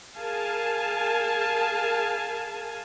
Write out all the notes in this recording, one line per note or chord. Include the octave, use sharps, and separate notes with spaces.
G#4 A#4 F5 G#5 A5